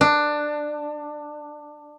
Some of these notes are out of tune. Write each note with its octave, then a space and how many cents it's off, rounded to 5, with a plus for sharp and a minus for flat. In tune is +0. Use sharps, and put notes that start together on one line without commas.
D4 +15